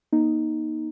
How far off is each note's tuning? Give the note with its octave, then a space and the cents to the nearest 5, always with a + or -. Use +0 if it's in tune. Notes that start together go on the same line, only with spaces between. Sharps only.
A#3 +40 D#4 +0